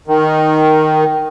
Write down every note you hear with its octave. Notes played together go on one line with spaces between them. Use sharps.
D#3